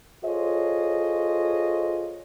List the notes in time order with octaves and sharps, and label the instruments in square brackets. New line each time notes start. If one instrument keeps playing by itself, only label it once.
[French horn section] F4 G#4 A4 C5 C#5 D#5